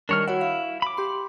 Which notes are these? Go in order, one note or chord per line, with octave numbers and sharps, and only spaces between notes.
D#3 G3 D4 A#4 C#5 F6
E4 F#4 C#5 F#5
F5
B5 D6
G4 C6